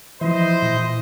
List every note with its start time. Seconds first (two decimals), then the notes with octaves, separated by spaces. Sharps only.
0.21 E3 F3 E4 C5 D#5
0.62 A#2